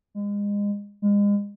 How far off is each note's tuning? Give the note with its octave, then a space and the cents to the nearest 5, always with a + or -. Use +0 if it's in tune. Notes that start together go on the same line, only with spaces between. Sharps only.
G#3 -30
G#3 -35